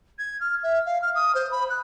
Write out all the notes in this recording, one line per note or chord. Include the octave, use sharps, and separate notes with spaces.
G#6
F6
E5
F5
F6
D#6
C5
B5
F#6